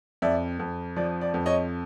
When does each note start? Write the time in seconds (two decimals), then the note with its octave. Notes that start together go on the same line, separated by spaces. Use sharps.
0.22 F2 D5 E5
0.59 F2
0.96 F3 D5
1.21 D5
1.34 F2
1.46 C#5 D#5